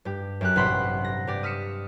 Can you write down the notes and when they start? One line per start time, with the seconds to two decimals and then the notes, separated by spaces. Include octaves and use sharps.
0.05 G2 G4
0.41 F#2 G4 F#6
0.56 A1 G2 C3 F#5 B5 C6
1.04 A#6
1.27 G2 G4 D5
1.43 D#6 F6 B6 C#7 E7